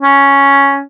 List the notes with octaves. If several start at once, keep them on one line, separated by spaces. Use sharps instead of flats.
C#4